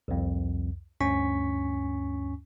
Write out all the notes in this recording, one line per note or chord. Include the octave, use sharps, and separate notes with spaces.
C2 F2
D2 G2 C#4 G#5 C#6 B6